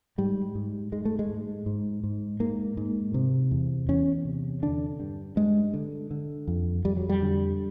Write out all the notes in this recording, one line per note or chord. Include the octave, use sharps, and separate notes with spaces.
G#2 G3
G#2
G#2 G#3
A3
G#3
G#2
G#2
G#2
G#2 A#3
G#2
C3
E2
E2 C#4
C3
D3 D4
G2
G2 G#3
D3
D3
F2
F2 G3
F#3
G3
D3